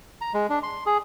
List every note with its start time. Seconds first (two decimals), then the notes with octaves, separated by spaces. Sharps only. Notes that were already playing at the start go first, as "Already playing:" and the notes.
0.21 A#5
0.34 G#3
0.50 D4
0.63 C6
0.86 G#4